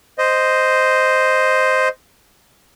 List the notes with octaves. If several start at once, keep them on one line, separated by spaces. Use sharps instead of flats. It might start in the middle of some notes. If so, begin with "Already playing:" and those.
C5 D#5